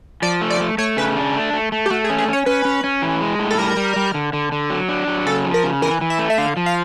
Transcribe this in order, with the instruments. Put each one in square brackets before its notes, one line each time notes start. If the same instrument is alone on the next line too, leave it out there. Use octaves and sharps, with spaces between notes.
[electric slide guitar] F3 [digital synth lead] D5
[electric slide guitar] A3
[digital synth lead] D5
[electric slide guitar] A3
[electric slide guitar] A3 [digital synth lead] C#5
[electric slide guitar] C#3 [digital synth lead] B4
[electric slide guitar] D4
A3
A3
A3
[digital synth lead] G4
[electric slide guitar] A3 [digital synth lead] F#4
[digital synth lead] G#4
[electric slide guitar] C#4
[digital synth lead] G#4
[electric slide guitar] C#4 [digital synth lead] C#5
[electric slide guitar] C#4 [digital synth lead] B4
[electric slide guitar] C#4
C#4
E3
G#3
A2
[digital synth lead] A4
[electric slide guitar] G3 [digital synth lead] A#4
[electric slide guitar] G3
G3
D3
D3
D3
F#3
D4
F#3
[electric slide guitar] C#3 [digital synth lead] A4
[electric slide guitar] F3
[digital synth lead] A#4
[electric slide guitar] C#3
[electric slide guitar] E3 [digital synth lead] A#4
[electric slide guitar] E3
[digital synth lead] E5
[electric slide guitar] A3
[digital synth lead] E5
[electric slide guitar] D3 [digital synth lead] F5
[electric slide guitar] F3
[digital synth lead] F5